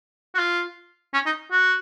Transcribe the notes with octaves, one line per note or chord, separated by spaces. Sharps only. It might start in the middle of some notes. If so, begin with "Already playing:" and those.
F#4
F4
C#4
D#4
F#4